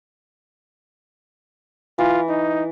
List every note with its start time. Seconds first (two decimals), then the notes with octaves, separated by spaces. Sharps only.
1.99 E3 F4
2.29 D#4